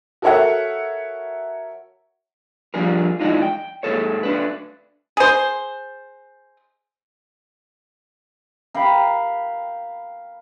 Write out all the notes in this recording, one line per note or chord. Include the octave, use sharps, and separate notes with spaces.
F#4 A4 A#4 C#5 E5 F#5
F3 G3 D4 G#4 A#4
E3 G#3 C4 D4 D#4 F4
G5
G#2 F#3 G#4 A4 C#5
A3 D4 B4
G#4 C5
A#4 F5 G5 B5